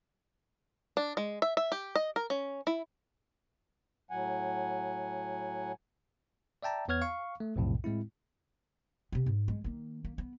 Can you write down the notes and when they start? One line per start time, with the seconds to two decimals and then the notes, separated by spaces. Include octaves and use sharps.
0.97 D4
1.17 G#3
1.42 E5
1.57 E5
1.72 G4
1.96 D#5
2.16 A#4
2.30 C#4
2.67 E4
4.11 A2 F#3 F#5 G#5
6.63 D5 E5 G5 A5 A#5
6.88 E2 B3 C#5 F6 G#6
7.01 F5 C#6
7.40 A3
7.56 B1 F2 A2 C3
7.84 A2 G#3 C4 E4
9.12 C3 B3
9.26 G#2
9.48 G#3
9.64 D#3 A#3
10.05 A#3
10.18 B3